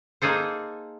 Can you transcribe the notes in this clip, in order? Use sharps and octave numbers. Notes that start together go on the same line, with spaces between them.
A#3 D#4 G#4 A4 C5